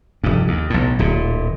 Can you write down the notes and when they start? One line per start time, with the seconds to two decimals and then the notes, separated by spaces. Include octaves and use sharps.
0.24 F1 G2
0.48 D#2
0.70 B1 A2
0.99 D1 A#2